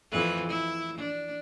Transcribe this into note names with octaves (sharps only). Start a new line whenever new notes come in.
F2 E3 B4
E4
D4